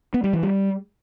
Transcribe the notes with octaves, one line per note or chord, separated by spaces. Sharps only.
B3
G3
E3
G3